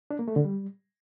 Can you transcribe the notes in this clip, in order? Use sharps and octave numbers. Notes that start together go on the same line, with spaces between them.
D4
A#3
A3
D3
G3